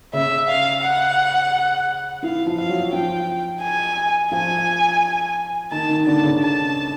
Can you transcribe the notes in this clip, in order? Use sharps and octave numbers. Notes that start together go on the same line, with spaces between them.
C#3 C#4 E5
F5
F#5
E3 E4 F5
F3 F4
F5
F#3 F#4
F3 F4 G5
G#5
F3 F4 G#5
D#3 D#4 A5
D#3 D#4
D3 D4 A5
C#3 C#4
A5